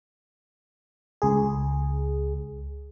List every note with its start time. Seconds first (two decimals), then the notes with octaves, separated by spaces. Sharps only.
1.22 C#2 G#4